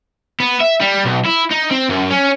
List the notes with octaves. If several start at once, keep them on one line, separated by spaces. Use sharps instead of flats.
B3
E5
G3
B1
E4
D#4
C4
F#2
C#4